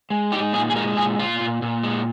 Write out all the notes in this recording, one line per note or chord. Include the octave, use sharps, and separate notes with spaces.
G#3
D#4 G4
A#2 G#4
G#4
G#3 A#4
A#2 G#4
A#2 F4
A#2
A#2
G#3